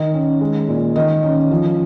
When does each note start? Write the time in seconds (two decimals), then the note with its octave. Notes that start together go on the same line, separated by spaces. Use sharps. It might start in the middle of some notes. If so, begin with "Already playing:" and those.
Already playing: D#3 D#5
0.14 C#4
0.41 G#3
0.68 A#2
0.96 D#3 D#5
1.23 C#4
1.51 F3